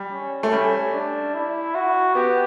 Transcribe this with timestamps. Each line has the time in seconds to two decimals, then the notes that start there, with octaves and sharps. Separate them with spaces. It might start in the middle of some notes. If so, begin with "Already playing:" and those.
Already playing: G3
0.12 C#4
0.43 A3
0.52 G3 C#4
0.93 D4
1.34 E4
1.75 F#4
2.15 B3 G4